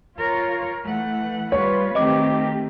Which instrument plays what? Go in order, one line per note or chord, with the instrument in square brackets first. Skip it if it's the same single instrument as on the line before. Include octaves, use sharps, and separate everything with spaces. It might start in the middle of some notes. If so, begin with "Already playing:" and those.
[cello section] F4 C#5 [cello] A#4
[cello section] E3 [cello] A3 F#5
[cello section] G3 F4 B4 [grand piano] C#5
[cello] D#3 A3 [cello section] C4 G4 [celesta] D#5 D6